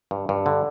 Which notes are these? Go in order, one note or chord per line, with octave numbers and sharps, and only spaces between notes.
G2
G2
D3